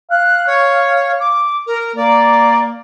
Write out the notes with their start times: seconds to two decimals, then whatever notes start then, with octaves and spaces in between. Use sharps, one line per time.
0.11 F5 F#6
0.47 C#5
1.20 D6
1.67 A#4
1.96 A#3 D5